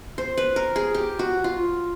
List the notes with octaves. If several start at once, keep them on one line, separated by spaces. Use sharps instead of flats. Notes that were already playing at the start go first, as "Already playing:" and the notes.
C5
B4
A#4
G#4
G4
F#4
F4